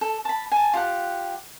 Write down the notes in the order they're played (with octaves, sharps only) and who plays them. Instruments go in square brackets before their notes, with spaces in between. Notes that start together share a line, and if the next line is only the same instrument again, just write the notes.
[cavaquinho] A4
A5 B5
G#5 A5
F4 G4 F#5